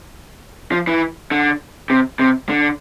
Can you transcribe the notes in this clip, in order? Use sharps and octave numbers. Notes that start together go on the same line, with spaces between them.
F3
E3
D3
C3
C3
D3